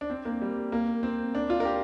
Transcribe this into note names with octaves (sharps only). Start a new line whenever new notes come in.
D4
C4
A#3
G3
A#3
C4
D4
F4
A#4
G4